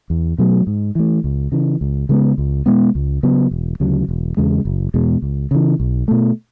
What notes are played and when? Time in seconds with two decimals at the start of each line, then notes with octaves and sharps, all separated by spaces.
0.10 E2
0.38 B2 F#3 A3
0.67 G#2
0.95 E3 A3
1.24 C#2
1.52 C#3 E3
1.81 C#2
2.09 C#3 G#3 B3
2.38 C#2
2.66 B2 G#3 B3
2.95 C#2
3.23 C#3 F#3 B3
3.51 E1
3.80 D2 C#3 F#3
4.09 E1
4.37 E2 C#3 G#3
4.65 F#1
4.94 E2 B2 G#3
5.22 C#2
5.51 C#3 E3
5.80 B1
6.08 B2 A3